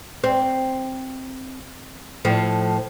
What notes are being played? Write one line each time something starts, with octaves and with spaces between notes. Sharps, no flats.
C4
A2 F3